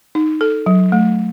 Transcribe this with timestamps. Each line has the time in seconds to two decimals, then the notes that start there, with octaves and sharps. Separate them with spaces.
0.15 D#4
0.41 A4
0.66 F#3
0.92 A3